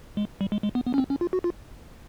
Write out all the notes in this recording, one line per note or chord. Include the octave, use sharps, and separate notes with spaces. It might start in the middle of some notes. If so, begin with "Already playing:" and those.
G#3
G3
G#3
G#3
B3
B3
C#4
C4
C#4
F4
F#4
F4